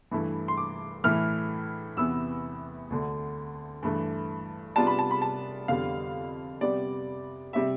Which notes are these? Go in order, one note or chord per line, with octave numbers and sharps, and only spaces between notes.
G2 E3 A3 E4
C6
D6
A2 E3 A3 E4 F6
E2 C3 E3 B3 E6
D2 D3 A3
G2 E3 A3
C3 G3 B3 D4 F4 A5
B5
A5
B5
A5
F2 D3 G3 B3 F5
C3 G3 B3 D5
C3 G3 E5